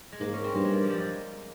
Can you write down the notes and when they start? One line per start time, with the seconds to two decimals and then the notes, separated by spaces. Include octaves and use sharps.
0.12 G#3
0.21 G#2 A#3
0.33 C#4
0.44 C4
0.55 G2 A#3
0.65 G#3
0.72 G3
0.84 F3
0.90 G3
0.99 G#3